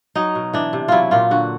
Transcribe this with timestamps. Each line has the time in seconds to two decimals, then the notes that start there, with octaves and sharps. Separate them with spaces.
0.15 F#3 D#4
0.35 B2
0.53 E3 D4
0.73 C3
0.88 F#3 E4 F4
1.11 A#2 F4
1.31 D3 F#4